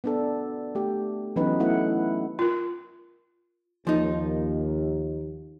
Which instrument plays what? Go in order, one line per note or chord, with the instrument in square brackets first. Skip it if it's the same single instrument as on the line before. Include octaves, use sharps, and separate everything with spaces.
[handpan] B3 D4 A4
A3 G4
E3 F#3 B3 C#4 D#4 B4
A3 B3 E4 F#5
[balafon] F4 A#4
[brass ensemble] D#2 [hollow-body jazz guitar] F3 D#4